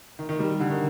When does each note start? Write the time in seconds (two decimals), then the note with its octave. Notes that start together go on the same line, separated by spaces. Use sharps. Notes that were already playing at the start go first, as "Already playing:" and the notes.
0.19 D#3
0.29 D#3
0.39 G3
0.60 D3
0.70 D#3